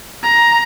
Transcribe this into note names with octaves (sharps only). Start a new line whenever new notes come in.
A#5